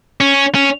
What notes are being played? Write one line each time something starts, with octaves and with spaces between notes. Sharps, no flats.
C#4
C#4